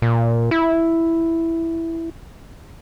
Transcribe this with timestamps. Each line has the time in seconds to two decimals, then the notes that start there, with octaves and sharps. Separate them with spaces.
0.02 A#2
0.51 E4